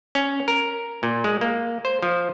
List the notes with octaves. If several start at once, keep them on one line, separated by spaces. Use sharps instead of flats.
C#4
A#4
A#2
G#3
A#3
C5
F3